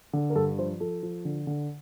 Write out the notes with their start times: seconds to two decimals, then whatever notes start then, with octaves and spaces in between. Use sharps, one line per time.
0.13 D3
0.30 A#4
0.36 G2 A4
0.58 F3 C5
0.80 F3 A4
1.03 F3
1.25 D3
1.47 D3